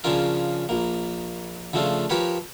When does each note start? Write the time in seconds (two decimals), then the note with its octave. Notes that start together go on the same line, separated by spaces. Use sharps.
0.04 C#3 F3 C#4 D4 F4 A#4
0.69 A#1 A#3
1.73 C#3 F3 A3 D4 F4
2.10 F3 G4 A#4 B4 C#5